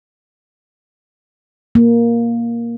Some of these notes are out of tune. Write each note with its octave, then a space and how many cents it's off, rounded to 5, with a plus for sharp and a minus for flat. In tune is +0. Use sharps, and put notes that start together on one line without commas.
A#3 +5